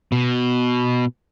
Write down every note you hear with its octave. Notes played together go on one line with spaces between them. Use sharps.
B2